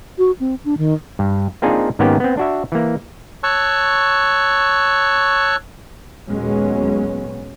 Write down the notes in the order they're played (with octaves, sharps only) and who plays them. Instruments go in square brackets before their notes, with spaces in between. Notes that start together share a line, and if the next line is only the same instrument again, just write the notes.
[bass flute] F#4
C4
D4
D#3
[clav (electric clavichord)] G2
A#3 C4 D4 D#4 F4 G#4
G#2 D#3 A#3 B3 C#4 G4
B3 C4
D4 F#4 E5
E3 A#3
[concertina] C#5 A5 C#6 E6 F#6
[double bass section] D#2 A#2 F#3 G#3 B3 C#4